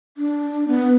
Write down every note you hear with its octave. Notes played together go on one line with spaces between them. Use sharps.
D4
B3